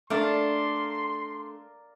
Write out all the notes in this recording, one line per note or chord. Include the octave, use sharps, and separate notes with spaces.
A3 D4 A#4 D5 F5 C6